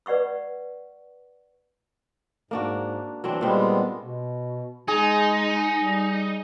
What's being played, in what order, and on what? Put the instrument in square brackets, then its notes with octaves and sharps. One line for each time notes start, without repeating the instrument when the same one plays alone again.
[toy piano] B4 D5 F#5 C#6 E6
[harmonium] G#2 [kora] A#3 D4 F#4
[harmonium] E3 [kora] F#3 C4 D4
[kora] A#2 C4 G4 [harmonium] G3 G#3 B3
[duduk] B2
[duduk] G#3 [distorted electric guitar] D#4 [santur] G#4
[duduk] G3